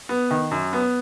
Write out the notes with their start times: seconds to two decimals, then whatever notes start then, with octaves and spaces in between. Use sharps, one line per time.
0.09 B3
0.31 D#3
0.51 F#2
0.73 B3